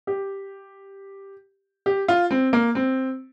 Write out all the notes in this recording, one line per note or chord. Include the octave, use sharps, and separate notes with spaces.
G4
G4
F4
C4
A#3
C4